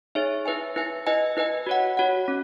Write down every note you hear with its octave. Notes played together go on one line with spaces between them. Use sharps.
D#4 G#4 C#5 E5
E4 B4 E5 G#5
E4 B4 E5 G#5
E4 B4 D#5 G#5
E4 B4 D#5 G#5
F#4 C#5 F#5
F#4 C#5 F#5
C#4